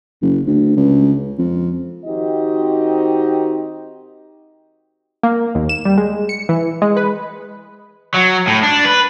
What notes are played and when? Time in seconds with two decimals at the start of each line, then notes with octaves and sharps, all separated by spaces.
0.22 F#1
0.46 D2
0.76 C#2
1.38 F2
2.06 D#3 C4 D#4 F#4 G4 D#5
5.23 A#3
5.55 D#2
5.69 E7
5.85 G3
5.98 G#3
6.29 C#7
6.49 E3
6.82 G#3
6.97 B4
8.14 F#3
8.47 A2
8.63 D4
8.85 B4